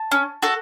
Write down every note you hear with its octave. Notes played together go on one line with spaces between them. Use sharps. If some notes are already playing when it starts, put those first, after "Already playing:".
Already playing: A5
C#4
F#4 A4